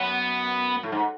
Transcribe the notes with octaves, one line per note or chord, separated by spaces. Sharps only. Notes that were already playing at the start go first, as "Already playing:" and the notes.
Already playing: F#2 B3
A2
G#2